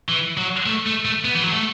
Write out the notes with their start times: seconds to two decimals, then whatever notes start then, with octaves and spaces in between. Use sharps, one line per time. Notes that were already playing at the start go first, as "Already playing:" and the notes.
0.09 E3
0.37 F#3
0.66 A3
0.86 A3
1.05 A3
1.25 B3
1.35 E3
1.43 F#3
1.53 A3